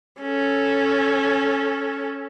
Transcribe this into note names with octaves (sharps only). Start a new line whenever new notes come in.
C#4 A4